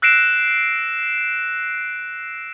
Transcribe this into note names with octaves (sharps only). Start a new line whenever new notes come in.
E6 F#6 A#6 C7 D7 E7